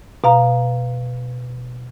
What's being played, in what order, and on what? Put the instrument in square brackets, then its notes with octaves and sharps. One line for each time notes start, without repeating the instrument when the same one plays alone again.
[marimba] B2 F5 A#5